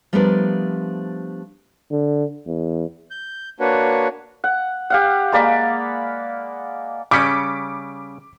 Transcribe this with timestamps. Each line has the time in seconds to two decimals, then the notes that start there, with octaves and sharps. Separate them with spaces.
0.13 F3 G3 A3 B3 D4 A#4
1.91 D3
2.47 E2
3.11 G6
3.60 A#3 D4 F#4 B4 C#5
4.44 F#5
4.90 G4 F5 F#5
5.32 G#3 A#3 D5 B5
7.11 C#3 G3 C#4 D6 B6 C#7